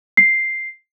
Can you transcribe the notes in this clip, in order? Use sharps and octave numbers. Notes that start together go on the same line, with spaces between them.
C7